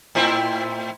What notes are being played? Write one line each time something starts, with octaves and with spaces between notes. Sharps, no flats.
A2 C4 E4